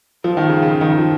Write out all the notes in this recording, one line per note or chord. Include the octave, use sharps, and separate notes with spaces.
F3
D#3
C#3
C#3
D#3
F3